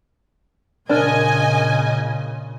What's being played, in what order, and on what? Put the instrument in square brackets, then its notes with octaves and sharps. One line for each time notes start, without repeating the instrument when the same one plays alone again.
[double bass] A#2 C#3 [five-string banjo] D4 A#4 [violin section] D#5 G#5